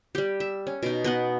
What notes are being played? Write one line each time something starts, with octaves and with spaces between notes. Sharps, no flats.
G3 G4
E5
C#4
B2 D#4
B3 D#5 F#5